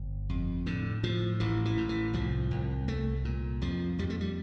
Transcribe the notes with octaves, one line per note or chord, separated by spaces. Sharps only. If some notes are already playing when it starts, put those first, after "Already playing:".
Already playing: G1
F2
A2 D3
A2 F3
A1 E3
E3
A2
E3
C2 F3
C2
C2 A3
A#2
F2 F3
F2 G3
A3
G3